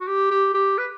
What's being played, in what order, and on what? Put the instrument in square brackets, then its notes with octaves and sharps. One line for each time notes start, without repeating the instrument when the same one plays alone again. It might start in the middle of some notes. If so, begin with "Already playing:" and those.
[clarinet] F#4
G4
G4
G4
B4